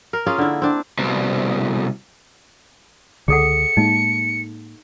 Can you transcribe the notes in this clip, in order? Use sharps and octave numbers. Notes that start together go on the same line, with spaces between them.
A#4
A#3 C#4 F4 G#4
D3 E4
C4 D4
C2 B2
C#2 D3 G#4 A4 F#5 C#7
A2 G#3 A#3 D#4